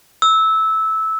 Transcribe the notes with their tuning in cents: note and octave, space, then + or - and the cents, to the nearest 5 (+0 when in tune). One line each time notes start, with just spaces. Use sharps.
E6 -15